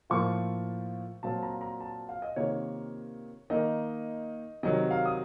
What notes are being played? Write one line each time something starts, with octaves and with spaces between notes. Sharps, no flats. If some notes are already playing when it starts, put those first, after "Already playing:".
A2 F3 A#3 F4 C#6
A#2 F#3 C4 F4 A5
A#5
A#5
A5
F5
D#5
C3 D#3 A#3 F4 C#5
D#3 A#3 D#4 D#5
C3 D#3 F#3 D#5
F5
D#6